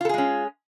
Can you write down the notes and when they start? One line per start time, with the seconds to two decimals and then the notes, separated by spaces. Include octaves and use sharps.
0.01 F4
0.05 A4
0.09 G#4
0.14 G#3
0.18 C#4